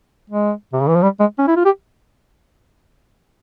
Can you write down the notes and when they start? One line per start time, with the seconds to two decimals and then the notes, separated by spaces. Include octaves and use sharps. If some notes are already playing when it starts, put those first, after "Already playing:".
0.30 G#3
0.73 C3
0.81 C#3
0.88 E3
0.95 F3
1.03 G3
1.20 G#3
1.39 C#4
1.47 E4
1.56 F4
1.65 G4